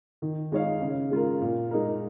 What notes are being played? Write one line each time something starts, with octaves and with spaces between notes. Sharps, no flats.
D#3
G#3 D#4 C#5 F5
C#3
G#3 F4 A#4
A#2
G#3 D#4 A#4